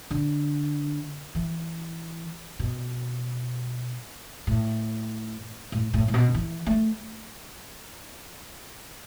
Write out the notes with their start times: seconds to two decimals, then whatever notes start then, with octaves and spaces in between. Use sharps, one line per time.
0.11 D3
1.35 E3
2.59 B2
4.47 A2
5.72 A2
5.94 A2
6.08 A2
6.14 B2
6.34 E3
6.66 A3